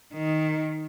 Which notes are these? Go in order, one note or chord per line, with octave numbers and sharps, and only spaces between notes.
D#3